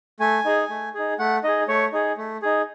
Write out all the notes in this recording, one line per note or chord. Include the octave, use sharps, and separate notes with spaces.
A3 G#5
D#4 G#4
A3
D#4 G#4
A3 F#5
D#4 G#4 D#5
A3 C#5
D#4 G#4
A3
D#4 G#4